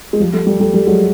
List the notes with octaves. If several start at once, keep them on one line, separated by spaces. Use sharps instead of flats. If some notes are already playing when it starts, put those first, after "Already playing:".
G#3
F3 G3
G3 A3
G3 A3
G3 A3
G3 A3
F#3 G#3